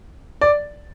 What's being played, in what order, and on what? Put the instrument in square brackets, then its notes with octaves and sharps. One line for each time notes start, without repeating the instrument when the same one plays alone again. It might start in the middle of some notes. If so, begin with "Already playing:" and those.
[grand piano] D5